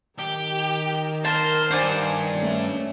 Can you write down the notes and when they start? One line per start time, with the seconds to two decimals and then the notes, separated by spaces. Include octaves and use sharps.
0.19 D#3 G4
1.25 A#4 C5 A5
1.71 G2 C5 D5 G#5
2.37 A3 C#4